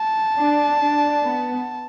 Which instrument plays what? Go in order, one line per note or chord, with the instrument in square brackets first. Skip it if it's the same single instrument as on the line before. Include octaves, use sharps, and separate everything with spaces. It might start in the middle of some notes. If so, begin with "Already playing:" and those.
Already playing: [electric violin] A5
[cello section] D4
D4
B3